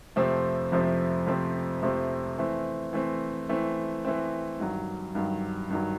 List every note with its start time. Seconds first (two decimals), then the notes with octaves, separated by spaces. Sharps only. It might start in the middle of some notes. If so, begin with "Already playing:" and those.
0.16 F2 C3 F3 A3 C4
0.72 F2 C3 F3 A3 C4
1.27 F2 C3 F3 A3 C4
1.82 F2 C3 F3 A3 C4
2.38 E3 A3 C4
2.93 E3 A3 C4
3.49 E3 A3 C4
4.05 E3 A3 C4
4.60 G2 D#3 F#3
5.15 G2 D#3 F#3
5.70 G2 D#3 F#3